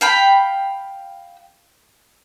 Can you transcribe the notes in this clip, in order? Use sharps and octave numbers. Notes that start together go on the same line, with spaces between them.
F5 G5 B5